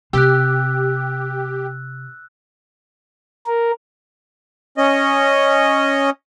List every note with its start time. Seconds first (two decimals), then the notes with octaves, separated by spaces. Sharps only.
0.13 C3 G4 E6 F#6
3.47 A#4
4.77 C#4 D#5